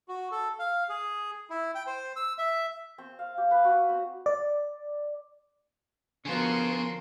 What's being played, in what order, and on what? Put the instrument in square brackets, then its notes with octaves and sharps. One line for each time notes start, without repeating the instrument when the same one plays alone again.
[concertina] F#4
A4
F5
G#4
E4
G5
C5
E6
E5
[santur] C4
F5
G4
B4
F#4
C4
[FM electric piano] D5
[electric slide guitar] D3 B3 [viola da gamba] F3 F#4 A#4 [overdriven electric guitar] C#4 G#4 [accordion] C6